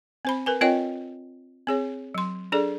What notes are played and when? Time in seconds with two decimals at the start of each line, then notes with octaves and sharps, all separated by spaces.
0.25 C4 C5 B5
0.46 A#4 B4 G#5
0.61 C4 F4 A#4 C#5 D#5 G5
1.67 C4 G#4 C#5
2.15 F#3 C6
2.52 D4 G#4 A4 D5